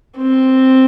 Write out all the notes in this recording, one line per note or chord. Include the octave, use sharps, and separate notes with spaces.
C4